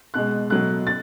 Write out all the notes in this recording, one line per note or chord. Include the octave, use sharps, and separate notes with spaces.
B2 G#3 F#6
B2 F#3 A3 F#6
A6